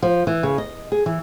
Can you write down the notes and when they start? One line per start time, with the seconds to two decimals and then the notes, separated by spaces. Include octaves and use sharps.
0.02 F3
0.27 E3
0.43 C#3
0.58 D#5
0.92 G#4
1.06 E3